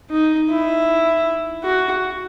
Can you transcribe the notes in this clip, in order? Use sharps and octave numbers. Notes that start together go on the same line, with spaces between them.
D#4
E4
F#4